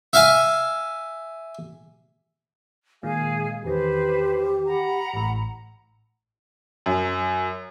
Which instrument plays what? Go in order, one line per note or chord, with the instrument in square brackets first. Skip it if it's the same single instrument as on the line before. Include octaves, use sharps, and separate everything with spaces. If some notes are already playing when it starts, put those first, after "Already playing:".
[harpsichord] E5 F5 G#5
[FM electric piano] A#2 D#3 [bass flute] G#3 [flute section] G#4 F5 G#5
[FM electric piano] E2 D#3 [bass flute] G4 [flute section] B4 C5
[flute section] F#5 A#5 B5
[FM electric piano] A1 A2
[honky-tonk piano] F#2